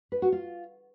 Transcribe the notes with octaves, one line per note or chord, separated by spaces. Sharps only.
B4
F#4
F4